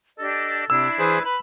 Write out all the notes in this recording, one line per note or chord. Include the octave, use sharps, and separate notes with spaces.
D4 G4 A4 D#5
C3 D4 E4 E6 G#6
E3 G#4 B4 C5
B4 B5